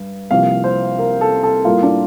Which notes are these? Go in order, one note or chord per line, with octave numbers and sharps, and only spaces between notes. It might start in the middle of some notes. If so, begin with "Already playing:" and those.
Already playing: G2
C2 C3 F3 A#3 F5
C5
A#4
A4
A4
A2 G3 A#3 F4
D4